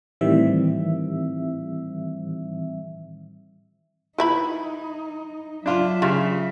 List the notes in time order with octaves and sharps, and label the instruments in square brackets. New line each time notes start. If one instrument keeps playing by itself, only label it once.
[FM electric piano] A2 D#3 E3 G3 C4 E5
[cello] D#4 [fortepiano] E4 [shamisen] B4 E5 B5
[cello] F#3 E5 [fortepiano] D4 F4
[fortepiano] C#3 [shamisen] F4 G4